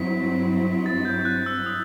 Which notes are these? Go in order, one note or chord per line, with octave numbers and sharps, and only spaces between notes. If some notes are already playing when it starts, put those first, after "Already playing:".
Already playing: G2 F#3 C4 E4 B6
A6
G6
F#6
E6
D#6